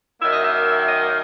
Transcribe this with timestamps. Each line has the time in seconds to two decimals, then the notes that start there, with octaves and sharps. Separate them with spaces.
0.21 F#2 D#3 A#3 E5
0.33 D#5
0.44 E5
0.65 E5
0.88 D#5